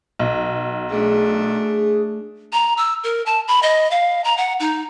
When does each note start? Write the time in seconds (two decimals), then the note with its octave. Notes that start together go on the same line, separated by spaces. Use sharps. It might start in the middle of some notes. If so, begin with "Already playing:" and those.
0.19 B1
0.90 A3 D4 G#4
2.53 A#5
2.77 E6
3.04 A#4
3.26 A5
3.48 B5
3.63 D#5
3.91 F5
4.24 A#5
4.37 F#5
4.60 D#4